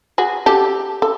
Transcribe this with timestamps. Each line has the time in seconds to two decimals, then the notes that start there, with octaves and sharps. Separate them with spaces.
0.18 F#4 G#4
0.46 G4 A4
1.02 A4